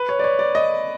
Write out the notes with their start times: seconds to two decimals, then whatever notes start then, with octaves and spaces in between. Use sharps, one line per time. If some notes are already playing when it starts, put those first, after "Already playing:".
Already playing: B4
0.09 C#5
0.19 D5
0.24 C#5
0.39 D5
0.55 D#5